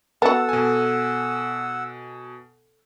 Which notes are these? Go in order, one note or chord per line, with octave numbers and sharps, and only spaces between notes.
B3 F#4 A4 F#5 A5 E6
B2 G#5